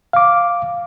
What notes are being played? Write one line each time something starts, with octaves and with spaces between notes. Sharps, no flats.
F5 D6